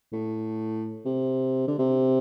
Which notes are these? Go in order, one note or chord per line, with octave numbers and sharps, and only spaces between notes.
A2
C3
D3
C3